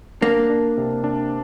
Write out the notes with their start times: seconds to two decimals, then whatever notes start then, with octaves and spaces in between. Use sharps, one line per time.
0.21 A#3 D4
0.50 D4
0.77 C3
1.04 D4